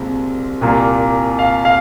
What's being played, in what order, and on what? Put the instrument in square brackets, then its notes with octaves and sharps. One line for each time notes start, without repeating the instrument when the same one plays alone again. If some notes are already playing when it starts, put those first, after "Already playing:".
Already playing: [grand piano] C2 A#2 G#3 C4
C2 A#2 A#3
F5
F5